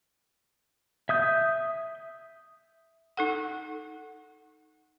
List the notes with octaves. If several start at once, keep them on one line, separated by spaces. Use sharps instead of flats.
E5 D#6 G6
D#4 A4 F#5